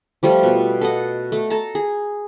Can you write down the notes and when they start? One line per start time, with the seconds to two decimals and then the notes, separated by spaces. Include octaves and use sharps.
0.23 F3 G3 A3 F4
0.43 B2
0.81 A4 D#5 F#5
1.32 A3
1.50 A4 A5 A#5
1.75 G#4